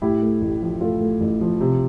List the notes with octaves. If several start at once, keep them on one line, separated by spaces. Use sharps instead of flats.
A2 E4 G4
A3
A1
F3
A2 F4 A4
A3
A1
F3
C3